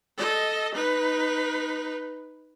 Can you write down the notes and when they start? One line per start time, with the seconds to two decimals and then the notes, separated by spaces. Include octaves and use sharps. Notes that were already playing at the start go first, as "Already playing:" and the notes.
0.17 A4 D#5
0.74 D#4 B4